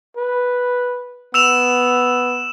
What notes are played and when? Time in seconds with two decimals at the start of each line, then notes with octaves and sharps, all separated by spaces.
0.17 B4
1.34 B3 E6 E7 F7